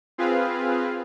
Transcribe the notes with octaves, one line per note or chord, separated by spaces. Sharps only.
C4 F4 G#4 B4 F5